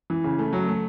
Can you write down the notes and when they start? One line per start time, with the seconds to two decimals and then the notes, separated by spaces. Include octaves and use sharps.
0.10 E3
0.24 C#3
0.39 A3
0.53 F#3
0.68 A3